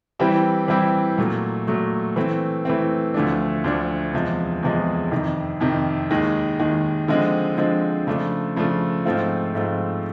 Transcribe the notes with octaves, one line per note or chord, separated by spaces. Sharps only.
E3 G3 C4 E4 G4
E3 G3 C4 E4 G4
A#2 F#3 A3
A#2 F#3 A3
E3 A3 C4
E3 A3 C4
D2 D3 F3 A3 D4
D2 D3 F3 A3 D4
E2 C3 F3 G#3
E2 C3 F3 G#3
F2 C3 D#3
F2 C3 D#3
D#2 D#3 G#3
D#2 D#3 G#3
D3 F3 G#3 C4
D3 F3 G#3 C4
C#3 F3 A3 D4
C#3 F3 A3 D4
G#2 F3 A3 C4 F4
G#2 F3 A3 C4 F4